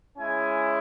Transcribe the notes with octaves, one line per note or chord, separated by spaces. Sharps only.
G#3 C#4 E4 G#5